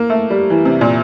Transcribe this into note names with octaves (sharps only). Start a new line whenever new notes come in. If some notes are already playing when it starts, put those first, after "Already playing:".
Already playing: A#3
A3
G3
E3
C3
A#2